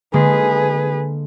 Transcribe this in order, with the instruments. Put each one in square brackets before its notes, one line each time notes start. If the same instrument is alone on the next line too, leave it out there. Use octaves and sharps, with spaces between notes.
[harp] D3 G#3 A#3 [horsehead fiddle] G#4 B4